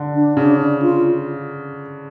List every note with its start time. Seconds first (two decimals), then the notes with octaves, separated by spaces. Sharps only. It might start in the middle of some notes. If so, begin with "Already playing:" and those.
Already playing: D3
0.14 D4
0.37 C#3 D4
0.60 D4
0.82 F4